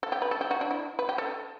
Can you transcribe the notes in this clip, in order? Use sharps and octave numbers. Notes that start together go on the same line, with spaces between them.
A4
G4
B4
A4
G4
F#4
D4
E4
B4
G4
A4